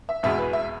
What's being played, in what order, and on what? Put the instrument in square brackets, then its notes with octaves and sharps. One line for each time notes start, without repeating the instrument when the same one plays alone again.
[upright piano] E5
[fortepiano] E2 B2 G#3 [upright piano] E5
[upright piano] B4
E5